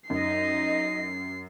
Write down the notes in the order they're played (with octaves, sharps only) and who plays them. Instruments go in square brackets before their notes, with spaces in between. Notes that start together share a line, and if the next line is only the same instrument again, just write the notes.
[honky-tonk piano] F#2 [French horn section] D#4 [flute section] D#5 [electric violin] C7